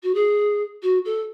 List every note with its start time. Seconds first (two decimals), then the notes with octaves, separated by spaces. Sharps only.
0.03 F#4
0.14 G#4
0.82 F#4
1.05 A4